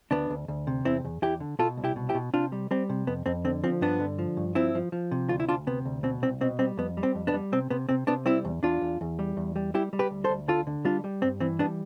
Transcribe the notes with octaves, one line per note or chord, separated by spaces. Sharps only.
D2 B3 D4
D2
D2
C3
E2 C4 E4
E2
E2 E4 G4
D3
B2 F4 A4
C2
E4 G4
B2
E4 G4
B2
C3 D4 F4
G3
G3 C4
C3
F2 B3
F2 C4
D3 C4
F3 C4
G2 B3 D4
D3
F3
G2
F3 C4 E4
F3
F3
C3
D2 F4
E4
D2 D4 F4
C3 B3
D2
B2 C4
C2 C4
B2 C4
G3 C4
F2 B3
G3
C4
F2
B3 D4
G3
C3 C4
C3 B3
C3 C4
C3 B3 D4
G3 C4 E4
E2
E2 D4 F4
E2
E2
G3
E2
G3
G3 E4 G4
G3
G4 B4
D2
A4 C5
D2
D3 F4 A4
D3
G3 D4 F4
G3
G2 C4
E3 C4
G3 B3 D4